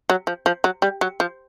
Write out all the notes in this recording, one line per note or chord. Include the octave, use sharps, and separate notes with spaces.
F#3
F3
F3
F#3
G3
F#3
F3